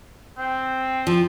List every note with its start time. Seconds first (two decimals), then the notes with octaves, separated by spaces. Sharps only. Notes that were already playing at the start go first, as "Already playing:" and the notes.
0.38 C4
1.07 F3